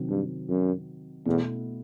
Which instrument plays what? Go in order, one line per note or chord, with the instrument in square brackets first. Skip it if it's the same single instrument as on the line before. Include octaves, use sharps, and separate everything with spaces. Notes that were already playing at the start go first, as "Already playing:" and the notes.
Already playing: [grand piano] C3 D#3 F#3 C4
[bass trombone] G2
F#2
[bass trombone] E2 [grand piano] B2 A3 E4 A4